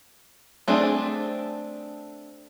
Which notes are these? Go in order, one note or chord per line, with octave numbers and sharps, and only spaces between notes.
A3 C4 D4 G#4